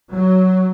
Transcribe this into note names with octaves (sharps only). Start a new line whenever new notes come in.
F#3